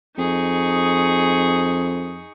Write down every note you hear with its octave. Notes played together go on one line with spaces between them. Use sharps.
F2 D#4 G#4 C#6